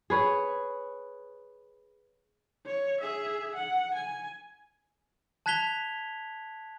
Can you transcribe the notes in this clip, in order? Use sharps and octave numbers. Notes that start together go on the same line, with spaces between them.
G#4 B4 C#5
C#5
G#4 E5
F#5
G#5
A5 F#6 G#6 B6 F7 G7